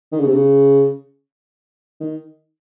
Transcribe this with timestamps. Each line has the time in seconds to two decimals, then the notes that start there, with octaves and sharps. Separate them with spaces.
0.12 D#3
0.20 C#3
0.27 C3
0.34 C#3
2.01 D#3